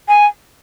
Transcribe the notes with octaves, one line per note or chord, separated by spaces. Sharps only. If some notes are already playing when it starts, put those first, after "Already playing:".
G#5